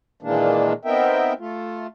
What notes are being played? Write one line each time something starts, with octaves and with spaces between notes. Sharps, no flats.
A#2 D#3 E3 G#3 A#3 D4
B3 C4 D#4 A#4 E5 G5
A3 F4